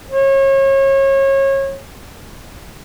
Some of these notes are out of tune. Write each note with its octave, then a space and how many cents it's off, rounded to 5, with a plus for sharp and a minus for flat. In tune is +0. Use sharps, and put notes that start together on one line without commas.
C#5 -30